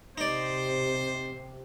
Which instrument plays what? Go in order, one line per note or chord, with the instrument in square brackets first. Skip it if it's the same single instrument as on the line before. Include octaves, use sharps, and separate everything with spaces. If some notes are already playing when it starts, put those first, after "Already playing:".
[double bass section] C3 [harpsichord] D#4 D5 [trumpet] C5